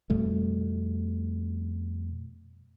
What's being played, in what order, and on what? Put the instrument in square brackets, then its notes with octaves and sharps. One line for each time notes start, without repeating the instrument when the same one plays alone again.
[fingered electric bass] F2 B2 G3 A3